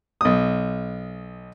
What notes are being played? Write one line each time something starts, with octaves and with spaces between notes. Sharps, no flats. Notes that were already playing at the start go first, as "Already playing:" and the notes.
B1 D#6